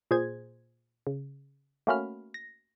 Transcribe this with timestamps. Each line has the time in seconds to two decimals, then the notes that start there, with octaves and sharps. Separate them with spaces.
0.11 A#2 G#4 C5 G#6
1.07 C#3
1.87 A3 A#3 C#4 F#4 B5 F6
2.34 A#6